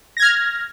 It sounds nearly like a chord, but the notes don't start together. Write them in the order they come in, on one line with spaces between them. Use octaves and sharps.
A#6 G#6 F6